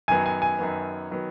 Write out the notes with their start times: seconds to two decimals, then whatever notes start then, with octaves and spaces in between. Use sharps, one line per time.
0.08 F#2 D#3 F#3 B3 G#5
0.26 G#5
0.42 G#5
0.59 F#2 D#3 F#3 B3
1.11 D#3 F#3 B3